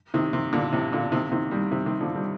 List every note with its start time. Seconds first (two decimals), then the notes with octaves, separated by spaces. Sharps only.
0.14 C3 D#3
0.33 C3 D#3
0.53 A#2 D3
0.72 A2 C3
0.92 A#2 D3
1.12 C3 D#3
1.32 C3 D#3
1.51 D#3 G3
1.71 C3 D#3
1.86 C3 D#3
2.01 D3 F3
2.15 D#3 G3